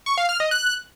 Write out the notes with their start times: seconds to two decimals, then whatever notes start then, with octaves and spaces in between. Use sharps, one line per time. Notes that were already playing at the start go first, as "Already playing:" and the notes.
0.06 C#6
0.18 F5
0.29 F6
0.40 D#5
0.51 F#6